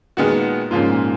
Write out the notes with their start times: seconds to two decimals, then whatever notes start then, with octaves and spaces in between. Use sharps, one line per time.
0.17 A#2 D#3 G#3 B3 F#4
0.71 G#2 C#3 F3 A#3 F4
0.89 A#2